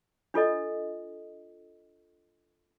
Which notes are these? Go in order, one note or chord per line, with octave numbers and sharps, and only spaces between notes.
D4 F4 A4 D#5